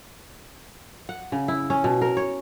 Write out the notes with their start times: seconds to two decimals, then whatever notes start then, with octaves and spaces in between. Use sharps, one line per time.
1.09 F#5
1.32 C#3
1.48 E4
1.70 C#4
1.84 B2
2.02 A#4
2.17 C#5